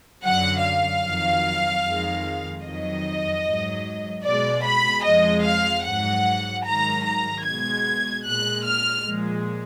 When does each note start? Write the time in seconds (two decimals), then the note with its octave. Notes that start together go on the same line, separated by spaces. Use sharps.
0.24 F#2 D3 F#3 F#5
0.64 F5
1.05 F2 D#3 F#3
1.85 F2 D#3 G#3
2.64 F2 D#3 F#3 D#5
3.44 G#2 F#3
4.25 B2 G#3 D5
4.65 B5
5.05 F2 F3 G#3 D#5
5.45 F5
5.85 G#2 F#3 F#5
6.65 G#2 D#3 F#3 A#5
7.06 A#5
7.45 B2 G#3 G#6
8.25 A#2 G#3 F#6
8.66 F6
9.06 A#2 F3 G#3